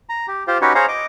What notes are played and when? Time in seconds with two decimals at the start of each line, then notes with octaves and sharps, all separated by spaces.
0.09 A#5
0.28 G4
0.47 F4 G4 C5
0.62 C#4 D#4 F#4 G4 B4 C#5
0.75 G#4 C5 C#5 F5 A#5
0.88 D#5 D6